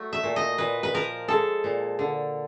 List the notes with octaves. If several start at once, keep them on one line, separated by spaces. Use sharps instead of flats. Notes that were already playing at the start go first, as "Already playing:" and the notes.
Already playing: F#3 A3
E5
A#2
D#5
A#2 B4
B4
F3 A#4
G#3 A4
A#2
D3